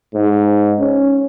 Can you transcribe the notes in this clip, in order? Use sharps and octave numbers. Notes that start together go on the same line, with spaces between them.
G#2
C#4